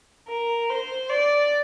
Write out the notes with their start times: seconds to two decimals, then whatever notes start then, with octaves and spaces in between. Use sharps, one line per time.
0.28 A#4
0.70 C5
1.10 D5